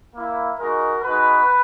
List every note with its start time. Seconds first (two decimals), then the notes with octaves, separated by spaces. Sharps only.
0.14 A#3 E4
0.59 G#3 D#4 F#4 A#4
1.03 G#3 D#4 F#4 B4